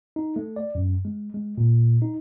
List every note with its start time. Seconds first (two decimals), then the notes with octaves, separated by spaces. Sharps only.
0.16 D#4
0.36 A3
0.56 D5
0.75 F#2
1.05 G#3
1.34 G#3
1.58 A#2
2.02 D#4